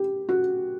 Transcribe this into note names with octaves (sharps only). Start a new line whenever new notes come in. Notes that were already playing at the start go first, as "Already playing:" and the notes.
Already playing: G4
F#4